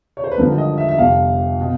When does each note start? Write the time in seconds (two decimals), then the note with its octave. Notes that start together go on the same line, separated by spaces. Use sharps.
0.17 C#5
0.24 C5
0.31 B4
0.38 G#1 G2 D3 F3 A#4
0.58 D#5
0.78 E5
0.89 E5
0.98 G1 F2 C3 F3 F5
1.61 B2